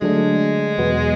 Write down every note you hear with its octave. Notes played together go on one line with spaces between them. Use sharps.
D3 F#3 G#3 A3 D4
E2 B2 F#3 B3